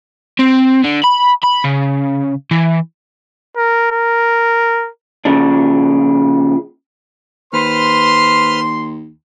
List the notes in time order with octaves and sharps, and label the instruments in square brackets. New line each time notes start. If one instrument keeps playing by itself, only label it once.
[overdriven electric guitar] C4
D3
B5
B5
C#3
E3
[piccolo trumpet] A#4
A#4
[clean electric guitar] A#2 C#3 F3 D4
[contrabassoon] D#2 [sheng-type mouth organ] B4 C5 F6 [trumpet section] C6